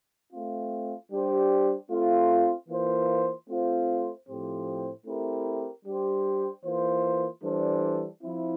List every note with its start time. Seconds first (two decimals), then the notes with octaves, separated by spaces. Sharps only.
0.31 A3 C4 F4
1.11 G3 D4 G4 C5
1.90 A3 C4 F4
2.69 E3 A#3 F4 C5
3.49 A3 C4 F4 C5
4.28 A2 F3 C4 G4 C5
5.06 A3 C4 E4 G4 A#4
5.85 G3 D4 G4 C5
6.65 E3 A#3 F4 C5
7.44 E3 G3 D4 A4 C5
8.23 F3 C4 E4